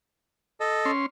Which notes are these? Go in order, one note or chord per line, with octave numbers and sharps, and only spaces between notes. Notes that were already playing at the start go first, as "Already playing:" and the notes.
A4 D#5
C#4 C6